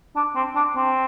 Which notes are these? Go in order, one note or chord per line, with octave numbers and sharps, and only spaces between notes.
D4
C4
D4
C4